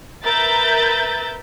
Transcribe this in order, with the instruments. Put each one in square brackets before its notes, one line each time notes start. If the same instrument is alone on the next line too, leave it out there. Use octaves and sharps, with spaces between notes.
[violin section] A#4 B4 E5 G6 A6